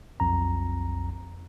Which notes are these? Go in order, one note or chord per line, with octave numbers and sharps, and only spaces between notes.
B1 F2 A#5